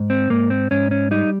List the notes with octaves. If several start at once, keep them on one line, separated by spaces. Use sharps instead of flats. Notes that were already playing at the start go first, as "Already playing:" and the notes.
Already playing: G#2
C4
G#2 A#3
C4
G#2 C#4
C#4
G3 D#4